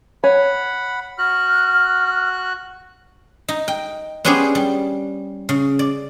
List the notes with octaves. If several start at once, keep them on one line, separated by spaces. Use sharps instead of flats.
C#5 F#5 G#5 B5
F#4 F6 F#6
D#4
G5
B3 C#4 D4 G4 G#4 C5
G3
C#3
D5